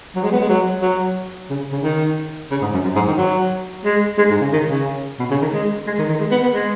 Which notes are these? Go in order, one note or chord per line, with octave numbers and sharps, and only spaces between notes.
F#3
G#3
B3
G#3
F#3
F#3
C#3
C#3
D#3
C#3
G#2
F#2
F#2
G#2
D#3
F#3
G#3
G#3
G#2
C#3
D#3
C#3
B2
C#3
D#3
G#3
G#3
D#3
D#3
G#3
B3
B3
G#3